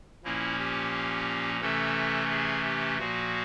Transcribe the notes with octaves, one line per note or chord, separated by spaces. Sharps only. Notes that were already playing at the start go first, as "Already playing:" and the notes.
A#2 F3 A#3 C#4 E4
G4
C3 E3 A3 C#4 A4
G#4
G4
A#2 F3 A#3 F#4